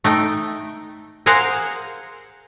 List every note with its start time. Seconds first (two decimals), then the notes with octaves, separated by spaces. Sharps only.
0.04 A3 D#4 G5
1.26 G#4 A#4 C5 F5 F#5 A#5